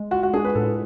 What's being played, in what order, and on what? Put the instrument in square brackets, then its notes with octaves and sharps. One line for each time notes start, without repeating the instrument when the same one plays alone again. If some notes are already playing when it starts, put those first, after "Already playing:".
Already playing: [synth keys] G#3
[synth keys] F4 [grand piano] F#4
[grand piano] F#4
[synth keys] D4 [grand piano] G#4
[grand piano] B4
[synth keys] A2 [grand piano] A4